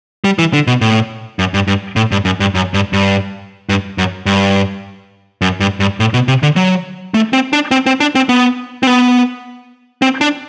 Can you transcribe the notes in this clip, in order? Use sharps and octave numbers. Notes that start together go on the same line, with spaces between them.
G3
E3
D3
B2
A2
F#2
G2
G2
A2
G2
F#2
G2
F#2
G2
G2
G2
F#2
G2
F#2
G2
G2
A2
B2
C3
D3
F#3
A3
C4
D4
C4
C4
D4
C4
B3
C4
B3
C4
D4